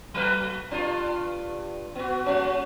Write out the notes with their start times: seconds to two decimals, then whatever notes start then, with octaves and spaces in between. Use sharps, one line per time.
0.14 F#3 A3 B4
0.71 G2 D4 F4
1.95 B3 F#4
2.24 G3 C#4 F#4